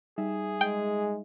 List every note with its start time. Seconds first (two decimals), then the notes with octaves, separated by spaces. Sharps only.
0.18 G3 D#4 G#4 E5
0.61 G#3 G5